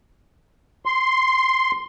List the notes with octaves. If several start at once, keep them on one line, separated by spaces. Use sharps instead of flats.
C6